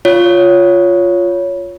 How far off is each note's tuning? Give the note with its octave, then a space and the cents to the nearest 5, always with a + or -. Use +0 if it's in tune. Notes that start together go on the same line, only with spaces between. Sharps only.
F4 +0 C#5 +10